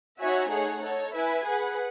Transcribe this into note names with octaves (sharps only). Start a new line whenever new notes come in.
D#4 F#4 C#5 E5 G#5
A3 D#4 G#4 C#5 F#5
D#4 A4 C#5
E4 B4 E5 G#5
G#4 B4 F#5